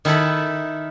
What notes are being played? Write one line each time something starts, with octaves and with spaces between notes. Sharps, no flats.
D#3 E4 A4 B5